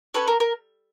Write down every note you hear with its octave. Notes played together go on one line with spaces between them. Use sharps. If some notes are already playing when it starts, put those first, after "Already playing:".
C#4 F#4 A4 B4 C#5
A#4
A#4